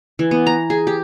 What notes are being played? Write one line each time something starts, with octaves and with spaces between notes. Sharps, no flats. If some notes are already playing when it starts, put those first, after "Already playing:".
E3
B3
A#5
G#4
G4